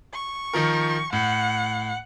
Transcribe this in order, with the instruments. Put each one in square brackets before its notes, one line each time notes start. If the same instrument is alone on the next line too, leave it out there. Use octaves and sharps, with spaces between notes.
[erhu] C#6
[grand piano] D#3 F3 A#4
[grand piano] A2 [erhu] F#5